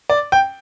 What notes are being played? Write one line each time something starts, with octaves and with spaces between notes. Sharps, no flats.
D5
G5